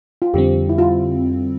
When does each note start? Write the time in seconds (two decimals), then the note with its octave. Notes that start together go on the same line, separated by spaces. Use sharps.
0.22 F4
0.34 F2 D3 G3 C4 G4
0.69 E4
0.78 F4